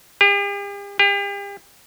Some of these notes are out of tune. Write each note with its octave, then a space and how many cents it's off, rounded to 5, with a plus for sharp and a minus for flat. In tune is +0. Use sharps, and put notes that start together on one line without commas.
G4 +45
G4 +40